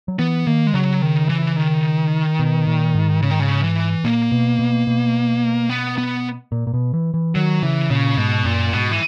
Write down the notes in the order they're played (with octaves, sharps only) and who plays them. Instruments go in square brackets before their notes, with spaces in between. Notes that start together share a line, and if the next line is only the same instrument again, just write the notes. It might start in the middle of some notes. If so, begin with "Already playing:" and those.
[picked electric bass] F#3
[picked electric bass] E3 [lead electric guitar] B3
[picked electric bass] D#3 [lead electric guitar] A#3
[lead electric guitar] G#3
[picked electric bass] C#3 [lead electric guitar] F#3
[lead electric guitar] D#3
E3
D#3
[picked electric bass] B2
A#2
G#2
[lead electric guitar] C#3
D#3
C#3
E3
[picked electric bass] A#2 [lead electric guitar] A#3
[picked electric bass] B2
B2
B2
[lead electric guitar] B3
B3
[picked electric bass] A#2
A#2
B2
E3
E3
[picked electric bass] D#3 [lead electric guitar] F#3
[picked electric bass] C#3 [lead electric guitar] E3
[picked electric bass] A#2 [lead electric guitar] C#3
[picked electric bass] G#2 [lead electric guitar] B2
[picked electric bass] F#2 [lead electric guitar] A#2
[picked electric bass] G#2 [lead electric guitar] B2
[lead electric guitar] E3